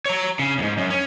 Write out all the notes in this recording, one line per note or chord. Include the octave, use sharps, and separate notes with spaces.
C#5 A#5
C#3
D#2 G#2
F#2
C#4